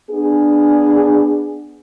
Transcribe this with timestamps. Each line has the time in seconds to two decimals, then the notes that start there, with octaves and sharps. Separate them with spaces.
0.10 B3 D4 G#4